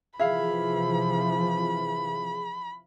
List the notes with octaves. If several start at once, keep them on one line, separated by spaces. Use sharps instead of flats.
C3 E3 F3 G#4 E5 F5 B5